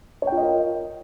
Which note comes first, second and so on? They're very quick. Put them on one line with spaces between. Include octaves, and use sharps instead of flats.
C#5 G5 F4 D#5 A#4